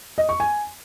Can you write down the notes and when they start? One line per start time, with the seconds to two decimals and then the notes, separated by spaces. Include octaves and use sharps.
0.18 D#5
0.29 C#6
0.40 G#5